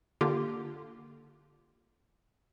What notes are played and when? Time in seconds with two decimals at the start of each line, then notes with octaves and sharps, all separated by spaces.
0.21 D3 A#3 F4 G4